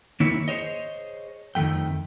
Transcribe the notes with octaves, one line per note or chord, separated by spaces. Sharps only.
D#3 A#3 E4 C#5
G#4 C5 C#5 D#5
F2 D#3 G3 A3 G5